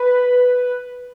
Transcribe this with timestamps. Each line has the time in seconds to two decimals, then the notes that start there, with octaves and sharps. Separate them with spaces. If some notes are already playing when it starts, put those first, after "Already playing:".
Already playing: B4